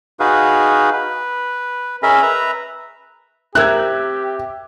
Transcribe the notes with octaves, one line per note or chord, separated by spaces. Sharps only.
D#4 F#4 G#4 B4 F5
B4
C#4 G#4 A#4 D#5 E5 B5
B4 E5 A#5
C4 G4 A#4 E5 E6 F#6 G#6